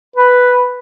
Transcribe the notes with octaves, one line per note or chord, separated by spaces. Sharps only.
B4